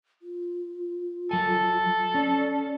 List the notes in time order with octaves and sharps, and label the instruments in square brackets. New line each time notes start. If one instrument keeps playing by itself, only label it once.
[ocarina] F4
[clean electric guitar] F#3 G#5 [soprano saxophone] A4
[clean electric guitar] C#4 [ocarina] D5